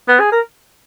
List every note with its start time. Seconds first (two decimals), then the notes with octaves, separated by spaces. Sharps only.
0.08 B3
0.20 G#4
0.32 A#4